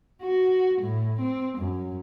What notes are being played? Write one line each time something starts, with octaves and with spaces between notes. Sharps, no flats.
F#4
A2
C4
F#2